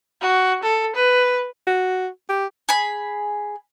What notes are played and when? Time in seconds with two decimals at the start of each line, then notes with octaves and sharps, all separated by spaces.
0.21 F#4
0.63 A4
0.95 B4
1.67 F#4
2.29 G4
2.69 G#4 B5